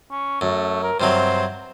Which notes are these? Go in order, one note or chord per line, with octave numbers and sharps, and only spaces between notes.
C#4
F#2 A3
A#4
G2 C3 F#3 C5